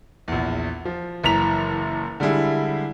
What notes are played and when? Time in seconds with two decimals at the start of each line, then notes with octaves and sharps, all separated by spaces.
0.28 A#1 E2
0.85 F3
1.24 F#1 E3 A#5 B6 F7
2.20 D3 G3 G#3 E4